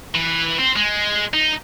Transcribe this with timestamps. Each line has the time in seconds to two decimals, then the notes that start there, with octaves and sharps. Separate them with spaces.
0.15 E3 B4
0.58 C4
0.76 G#3
1.34 D#4